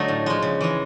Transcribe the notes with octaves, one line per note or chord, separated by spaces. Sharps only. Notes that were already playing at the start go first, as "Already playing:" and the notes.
Already playing: D3 F#3 A3 D#4
A2
F3 G#3
C#3
E3 G#3